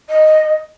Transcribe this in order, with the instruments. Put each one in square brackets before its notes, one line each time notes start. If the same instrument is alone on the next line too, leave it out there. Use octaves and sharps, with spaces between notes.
[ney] D#5